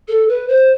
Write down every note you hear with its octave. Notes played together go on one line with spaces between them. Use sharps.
A4
B4
C5